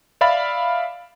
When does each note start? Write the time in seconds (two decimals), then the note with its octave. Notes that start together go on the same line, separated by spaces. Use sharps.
0.21 D5 E5 F5 B5 A6